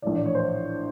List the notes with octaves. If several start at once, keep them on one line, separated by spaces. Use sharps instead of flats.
A#1 A2 E3 D5
D5
C#5
C5